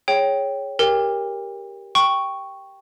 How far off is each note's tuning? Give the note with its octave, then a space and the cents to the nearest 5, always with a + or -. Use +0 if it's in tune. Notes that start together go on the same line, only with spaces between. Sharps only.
G#4 +0 C#5 +0 G5 +0
G4 +0 A#4 +0 G5 +40
G5 +0 C#6 +0